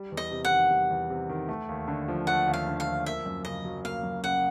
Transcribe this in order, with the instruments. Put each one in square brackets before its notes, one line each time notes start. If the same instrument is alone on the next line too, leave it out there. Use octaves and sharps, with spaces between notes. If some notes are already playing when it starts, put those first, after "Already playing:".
Already playing: [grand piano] G3
E2
[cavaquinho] D#5
[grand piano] C3
[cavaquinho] F#5
[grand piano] D#3
G3
E2
C3
D#3
A3
D#2
D3
F3
[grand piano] A3 [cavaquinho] F#5
[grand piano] D#2
[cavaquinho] F5
[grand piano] D3
[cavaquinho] F5
[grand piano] F3
[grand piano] A#3 [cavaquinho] E5
[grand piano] F#2
[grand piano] C#3 [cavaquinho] D#5
[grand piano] F#3
[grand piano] A#3 [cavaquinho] F5
[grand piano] F#2
[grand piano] C#3 [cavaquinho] F#5